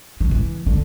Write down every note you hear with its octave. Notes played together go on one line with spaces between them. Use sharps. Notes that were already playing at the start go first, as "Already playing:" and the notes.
D#3
E3
D3